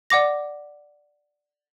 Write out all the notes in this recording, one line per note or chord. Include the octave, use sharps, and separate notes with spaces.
D5 F#5 D6 A#6